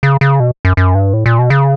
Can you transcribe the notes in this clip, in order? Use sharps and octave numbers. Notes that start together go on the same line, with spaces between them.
C#3
C#3
B2
F#2
F#2
G2
A2
A#2
B2
C#3